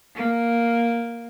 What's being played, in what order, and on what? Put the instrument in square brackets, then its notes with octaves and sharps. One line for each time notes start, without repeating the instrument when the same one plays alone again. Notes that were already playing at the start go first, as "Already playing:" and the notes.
[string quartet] A#3